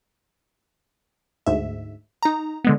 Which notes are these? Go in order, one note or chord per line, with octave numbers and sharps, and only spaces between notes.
D2 G#2 E5
D#4 A#5
D3 G#3 B3